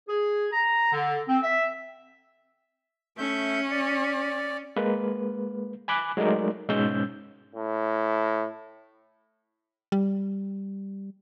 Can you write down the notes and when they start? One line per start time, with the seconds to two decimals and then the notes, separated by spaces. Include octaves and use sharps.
0.09 G#4
0.52 A#5
0.92 D3
1.29 C4
1.43 E5
3.18 A3 C#4 E5 G6
3.71 D5
4.76 G#3 A#3 B4
5.88 G#5 B5 D6 F#6
6.17 F#3 G#3 A3 D#4 A#4 D5
6.69 G#2 B2 G#3 C#4 E6 G6
7.55 A2
9.92 G3